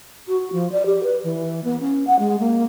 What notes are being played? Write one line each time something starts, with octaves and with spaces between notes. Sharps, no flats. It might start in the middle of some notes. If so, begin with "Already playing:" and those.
F#4
F3
D5
G4
B4
E3
B3
C#4
F#5
G#3
A#3